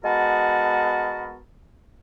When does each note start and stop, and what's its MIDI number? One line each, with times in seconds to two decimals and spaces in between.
0.04 1.38 56
0.04 1.38 59
0.04 1.38 66
0.04 1.38 70
0.04 1.38 81